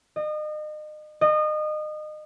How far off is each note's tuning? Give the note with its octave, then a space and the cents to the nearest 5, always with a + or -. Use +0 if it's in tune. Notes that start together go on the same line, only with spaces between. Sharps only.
D#5 -35
D#5 -30